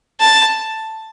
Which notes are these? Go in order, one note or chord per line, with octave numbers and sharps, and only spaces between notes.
A5